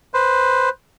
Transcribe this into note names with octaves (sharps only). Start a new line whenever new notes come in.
B4 C5